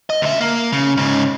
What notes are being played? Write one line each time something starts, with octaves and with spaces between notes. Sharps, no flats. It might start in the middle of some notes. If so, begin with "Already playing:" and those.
D#5
D2 E5
A#3
C#3
G#2 C#3